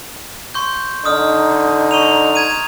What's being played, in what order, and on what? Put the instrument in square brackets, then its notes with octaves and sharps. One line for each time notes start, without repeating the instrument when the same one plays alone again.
[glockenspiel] C6 C#6 G6
[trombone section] D3 D#4 [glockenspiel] D#6 F6
[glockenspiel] C#6 D#7 F7
A#5 G#6 D#7